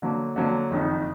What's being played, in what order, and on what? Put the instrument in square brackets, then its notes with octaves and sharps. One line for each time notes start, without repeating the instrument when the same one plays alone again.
[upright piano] D3 F#3 A#3
D3 F#3 A#3
F#1 F2 D#3